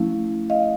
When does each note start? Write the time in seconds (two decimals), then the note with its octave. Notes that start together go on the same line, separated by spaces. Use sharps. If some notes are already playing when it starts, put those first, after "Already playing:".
Already playing: F3 A3 C#4 E4
0.50 D#5 F5